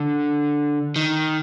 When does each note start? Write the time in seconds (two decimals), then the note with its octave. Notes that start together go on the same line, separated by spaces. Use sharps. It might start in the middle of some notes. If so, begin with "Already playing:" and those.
Already playing: D3
0.96 D#3